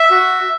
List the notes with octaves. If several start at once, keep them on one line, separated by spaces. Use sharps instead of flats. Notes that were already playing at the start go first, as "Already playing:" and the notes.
Already playing: E5
F#4